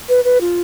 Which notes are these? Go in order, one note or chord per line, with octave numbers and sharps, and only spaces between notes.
B4
B4
F4